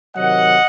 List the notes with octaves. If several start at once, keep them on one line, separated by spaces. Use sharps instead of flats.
C3 D#3 F#3 D#5 F#5